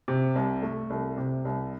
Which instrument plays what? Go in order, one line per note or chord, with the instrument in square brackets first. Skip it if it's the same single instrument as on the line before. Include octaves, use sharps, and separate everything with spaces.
[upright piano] C3
C2
A3
C2
C3
C2